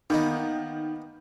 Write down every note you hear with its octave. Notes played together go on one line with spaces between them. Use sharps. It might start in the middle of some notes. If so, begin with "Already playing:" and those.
D#3 A#3 B3 D#4